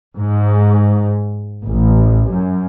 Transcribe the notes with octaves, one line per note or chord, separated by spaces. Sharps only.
G#2
A1
F#2